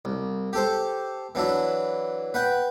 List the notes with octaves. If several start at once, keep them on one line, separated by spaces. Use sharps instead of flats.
C2
G4 A4 C5
E3 F#3 D4 E4
B4 F#5 G5